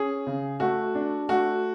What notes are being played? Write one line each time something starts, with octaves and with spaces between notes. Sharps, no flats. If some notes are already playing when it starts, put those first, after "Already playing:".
Already playing: C#4 G#4
C#3
A3 F#4
D4
A3 F#4